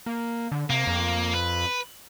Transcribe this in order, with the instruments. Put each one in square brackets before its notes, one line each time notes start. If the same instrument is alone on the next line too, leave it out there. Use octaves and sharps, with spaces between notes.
[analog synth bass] A#3
D3
[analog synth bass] C3 [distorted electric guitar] A#3
[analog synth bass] F2
[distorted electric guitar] B4